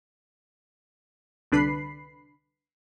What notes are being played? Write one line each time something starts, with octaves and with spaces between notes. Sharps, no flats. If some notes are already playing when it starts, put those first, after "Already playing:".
C2 D3 D4 B4 B5 C7